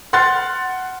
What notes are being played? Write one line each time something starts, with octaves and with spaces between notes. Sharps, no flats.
F#5 C6 F6 F#6 A6